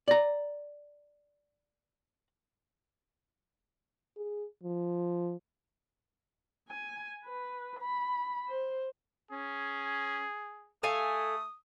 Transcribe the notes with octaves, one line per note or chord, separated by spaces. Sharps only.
D5 A#5
G#4
F3
G#5
B4
B5
C5
C#4 G#4
A3 A4 F5 G#5 D#6